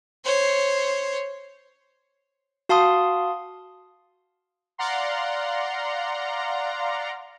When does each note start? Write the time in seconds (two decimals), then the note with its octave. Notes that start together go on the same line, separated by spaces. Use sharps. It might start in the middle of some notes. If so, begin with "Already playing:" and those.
0.24 C5 C#5
2.69 F#4 F5 A5 C6 D#6
4.78 D5 F5 F#5 A#5 C6